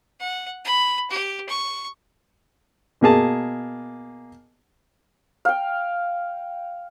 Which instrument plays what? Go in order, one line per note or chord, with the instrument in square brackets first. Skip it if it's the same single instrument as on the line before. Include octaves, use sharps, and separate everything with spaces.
[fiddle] F#5
B5
G4
C#6
[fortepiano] B2 A#3 G#4 A5
[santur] F5 G5